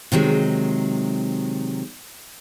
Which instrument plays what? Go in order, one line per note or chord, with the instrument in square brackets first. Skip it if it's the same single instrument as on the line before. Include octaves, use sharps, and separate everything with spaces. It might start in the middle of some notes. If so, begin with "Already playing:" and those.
[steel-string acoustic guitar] C3 D#3 F#3 G#3